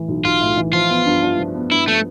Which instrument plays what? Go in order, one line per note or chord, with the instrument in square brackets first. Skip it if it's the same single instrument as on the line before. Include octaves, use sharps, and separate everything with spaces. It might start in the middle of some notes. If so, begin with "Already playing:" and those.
Already playing: [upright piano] A2 E3
B1
[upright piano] B1 [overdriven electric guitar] F4
[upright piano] A2
E3
[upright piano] F3 [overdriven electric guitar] F4
[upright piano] B3
G2
D4
F3
B3
[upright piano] G2 [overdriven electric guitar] E4
[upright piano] F3 [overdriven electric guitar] A3